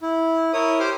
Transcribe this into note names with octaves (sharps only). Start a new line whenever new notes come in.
E4
E4 A#4 C#5 D#6
G4 C5 C6 D6 F6